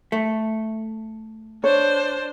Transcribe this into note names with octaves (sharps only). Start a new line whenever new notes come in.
A3
D4 C5 C#5